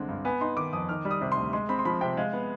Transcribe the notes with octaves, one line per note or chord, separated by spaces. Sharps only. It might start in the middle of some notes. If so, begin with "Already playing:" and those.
Already playing: C2 D3 G#3 C4
G2
B3 G#5
D#4 C6
D#3 D6
F2 D#6
D#3 F6
G3
D#6
C3
D2 C6
G#3 C6
C4 B5
C6
F3 B5
C3 G5
G#3 F5
B3